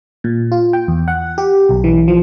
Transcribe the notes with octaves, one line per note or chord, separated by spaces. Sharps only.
A#2
F4
G5
E2
F#5
G4
B1
E3
F3